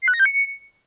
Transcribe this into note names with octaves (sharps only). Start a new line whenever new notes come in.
C7
F#6
A#6
G6
C#7